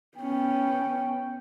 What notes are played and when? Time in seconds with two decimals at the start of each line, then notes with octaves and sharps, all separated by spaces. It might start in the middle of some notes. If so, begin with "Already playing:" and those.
0.18 B3 C#4 G5